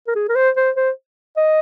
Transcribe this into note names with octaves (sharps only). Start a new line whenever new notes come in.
A#4
G#4
A#4
C5
C5
C5
D#5